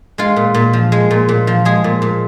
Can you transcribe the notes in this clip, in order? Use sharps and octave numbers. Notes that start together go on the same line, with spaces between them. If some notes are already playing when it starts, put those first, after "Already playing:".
G#3 F4
A#2
A#2
F3
G#3
A#2
A#2
F3
G#3 G#4
A#2
A#2